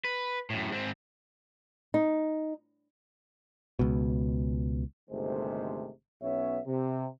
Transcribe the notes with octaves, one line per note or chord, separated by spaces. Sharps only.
B4
F#2 A2
G#2 C4
D#4
C#2 B2
G1 C3 D#3 G#3 A3 C5
B1 B3 C#4 C#5 E5
C3